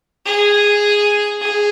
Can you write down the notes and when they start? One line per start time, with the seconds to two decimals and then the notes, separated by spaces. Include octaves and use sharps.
0.26 G#4
1.41 G#4